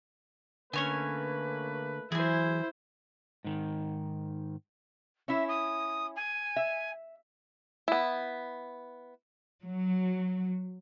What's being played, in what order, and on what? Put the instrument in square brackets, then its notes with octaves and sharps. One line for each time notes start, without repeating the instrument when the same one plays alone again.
[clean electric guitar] D3 [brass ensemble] A3 A#3 B4 [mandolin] C#4 C#5 G#5
[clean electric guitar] E3 F#3 [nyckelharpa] E4 C5 [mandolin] G#4 G#5
[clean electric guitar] G#2 D#3
[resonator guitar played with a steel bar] C#4 E4 [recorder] E5
[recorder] D#6
G#5
[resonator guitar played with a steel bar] E5
[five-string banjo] B3 E4
[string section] F#3